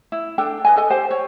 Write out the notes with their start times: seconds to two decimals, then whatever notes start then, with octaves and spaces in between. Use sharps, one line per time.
0.12 E4
0.38 D4 A4 G5
0.65 B4 D#5 G#5
0.77 A4 D#5 G#5
0.90 G4 C5 G5
1.10 C#5